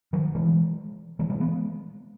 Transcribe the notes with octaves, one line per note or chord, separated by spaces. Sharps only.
D#3 F#3
E3 G#3
E3 G#3
E3 G#3
G#3 B3